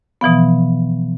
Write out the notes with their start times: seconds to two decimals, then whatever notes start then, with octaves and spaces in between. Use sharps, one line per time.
0.21 B2 E3 F3 B3